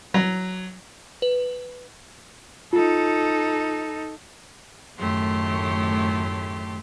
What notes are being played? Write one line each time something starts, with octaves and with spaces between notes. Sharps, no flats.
F#3
B4
D#4 F4 A4
F#2 A2 D#3 A3 G4 C6